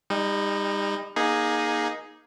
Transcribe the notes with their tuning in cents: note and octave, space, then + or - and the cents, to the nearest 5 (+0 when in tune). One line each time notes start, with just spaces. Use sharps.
G3 +35 D#4 +0
A#3 +25 D#4 +0 G#4 +0